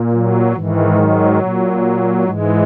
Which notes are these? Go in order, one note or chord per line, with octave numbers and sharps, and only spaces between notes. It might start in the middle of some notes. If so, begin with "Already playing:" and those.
Already playing: A#2
F#3
G#2 D#3 E3
F#3
A#2
G#2 E3 G#3